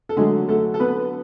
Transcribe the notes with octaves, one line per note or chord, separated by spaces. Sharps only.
A4
D3 F#3 G#3 A3 G#4
A3 A4
A4
B3 B4